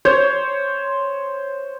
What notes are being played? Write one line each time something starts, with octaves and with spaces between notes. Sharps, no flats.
C5 C#5